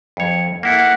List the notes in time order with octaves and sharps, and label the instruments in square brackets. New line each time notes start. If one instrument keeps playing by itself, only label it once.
[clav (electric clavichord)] F2 C#5
[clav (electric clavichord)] A#3 E4 A4 [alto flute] F#5